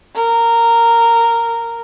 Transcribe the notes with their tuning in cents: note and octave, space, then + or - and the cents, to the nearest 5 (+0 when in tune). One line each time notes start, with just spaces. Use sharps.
A#4 -10